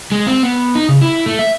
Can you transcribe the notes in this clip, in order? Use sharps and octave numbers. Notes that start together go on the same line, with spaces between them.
G#3
C4
B3
D#4
C#3
E4
A3
E5